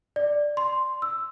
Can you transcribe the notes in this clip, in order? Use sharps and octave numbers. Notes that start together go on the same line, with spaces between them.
D5
C6
E6